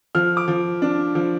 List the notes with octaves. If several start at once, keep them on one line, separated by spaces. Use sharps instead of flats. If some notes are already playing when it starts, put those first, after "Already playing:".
F3 F6
D6
F3
D4
F3